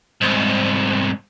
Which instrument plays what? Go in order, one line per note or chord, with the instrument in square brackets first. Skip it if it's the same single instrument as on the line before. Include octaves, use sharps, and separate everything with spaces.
[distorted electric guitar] C2 G#2